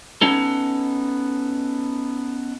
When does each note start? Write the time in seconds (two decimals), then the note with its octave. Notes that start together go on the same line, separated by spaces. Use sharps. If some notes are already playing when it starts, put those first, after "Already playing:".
0.22 B3 C#4 D#4 A4